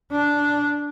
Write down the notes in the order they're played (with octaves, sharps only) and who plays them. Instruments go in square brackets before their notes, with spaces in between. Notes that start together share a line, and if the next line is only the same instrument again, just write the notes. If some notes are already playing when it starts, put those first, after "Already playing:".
[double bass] D4